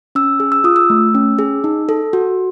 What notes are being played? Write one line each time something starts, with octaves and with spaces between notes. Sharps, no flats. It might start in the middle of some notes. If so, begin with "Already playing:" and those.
C#4 E6
G#4
E6
F4 D#6
E6
A3
C#4
G#4
D#4
A4
F#4